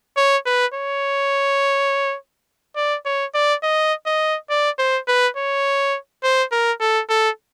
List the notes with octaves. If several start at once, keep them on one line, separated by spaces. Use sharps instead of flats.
C#5
B4
C#5
D5
C#5
D5
D#5
D#5
D5
C5
B4
C#5
C5
A#4
A4
A4